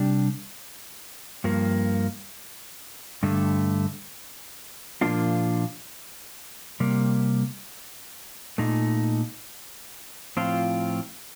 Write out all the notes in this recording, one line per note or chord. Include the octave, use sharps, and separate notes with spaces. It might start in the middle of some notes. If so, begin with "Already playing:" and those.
Already playing: C3 G3 D4
G2 F3 A#3
G2 D3 A3
A#2 F3 A#3 D4 F4
C3 G3 A#3
A#2 A3 D#4
A2 F3 C4 F4